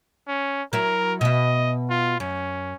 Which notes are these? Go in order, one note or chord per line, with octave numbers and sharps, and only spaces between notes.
C#4
F#3 E4 A#4
B2 D#5 E5
F4
F#2 C#4